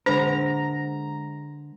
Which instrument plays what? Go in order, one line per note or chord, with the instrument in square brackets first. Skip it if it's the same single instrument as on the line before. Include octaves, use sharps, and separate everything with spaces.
[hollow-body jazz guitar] D3 G#3 A#4 [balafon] D4 [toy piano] C5 [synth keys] A#5